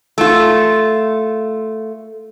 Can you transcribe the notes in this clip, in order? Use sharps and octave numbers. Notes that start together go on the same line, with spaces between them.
A3 F4